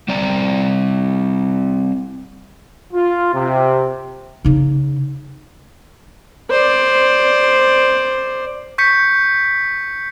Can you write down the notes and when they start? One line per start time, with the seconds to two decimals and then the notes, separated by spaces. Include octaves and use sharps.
0.08 G3 C4 D5 A#5
2.94 F4
3.34 C3
4.45 C#3 D#4
6.51 C5 D5
8.78 C#6 G6 B6 C#7